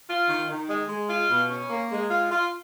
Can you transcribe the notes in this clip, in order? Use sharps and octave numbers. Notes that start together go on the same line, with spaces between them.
F4
D#3
D#3
G#3
G#3
F4
B2
C#4
A#3
G#3
F4
F4